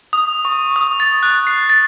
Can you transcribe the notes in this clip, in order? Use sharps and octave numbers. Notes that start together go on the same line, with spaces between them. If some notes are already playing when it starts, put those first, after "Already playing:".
D#6
C#6
D#6
A6
F#6
C7
A6